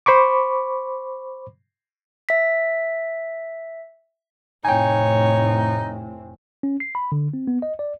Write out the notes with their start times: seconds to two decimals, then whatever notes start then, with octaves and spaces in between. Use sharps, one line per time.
0.06 C5 B5 C#6 D6
2.29 E5 B6
4.65 F1 A2 C4 D#4 C#5 G5 G#5
6.63 C#4
6.80 C7
6.95 B5
7.12 D3
7.34 C4
7.48 B3
7.62 D#5
7.79 D5